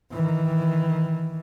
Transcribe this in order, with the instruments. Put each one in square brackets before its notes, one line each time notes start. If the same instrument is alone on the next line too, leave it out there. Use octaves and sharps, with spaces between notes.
[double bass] D#3 E3